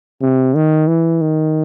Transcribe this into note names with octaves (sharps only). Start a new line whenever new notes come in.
C3
D#3
E3
D#3